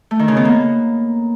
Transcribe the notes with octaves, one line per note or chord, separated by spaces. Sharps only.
A3
D#3
C#3
B3
A#3